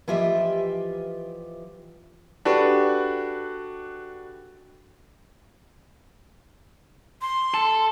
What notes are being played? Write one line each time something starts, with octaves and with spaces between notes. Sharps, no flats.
E3 F3 F4 G4 D#5 E5
D4 F#4 G4 A4 B4
C6
A4